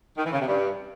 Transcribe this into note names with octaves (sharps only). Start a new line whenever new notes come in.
D#3
E3
C#3
C3
G2